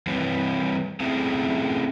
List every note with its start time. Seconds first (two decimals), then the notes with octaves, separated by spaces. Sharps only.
0.07 E3 G3 C4 E4 B4 C#5
1.00 A3 C4 C#4 E4 G#4 E5